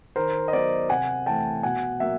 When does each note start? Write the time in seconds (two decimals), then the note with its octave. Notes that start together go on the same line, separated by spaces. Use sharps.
0.16 D#3 A#4 C5
0.48 D#5
0.53 F#3 B3 C5 D5
0.89 C3 F#5 G#5
1.26 E3 A3 G5 A5
1.63 B2 F#5 G#5
2.00 F#3 A#3 E5 F#5